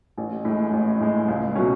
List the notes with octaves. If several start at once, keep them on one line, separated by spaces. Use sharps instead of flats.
A1
A2 G#3
A1
A2 G#3
C#2
B2 F#3 A3 C#4